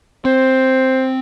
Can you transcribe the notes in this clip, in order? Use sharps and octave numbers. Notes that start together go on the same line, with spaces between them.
C4 C5